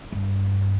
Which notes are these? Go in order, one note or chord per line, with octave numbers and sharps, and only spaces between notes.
G2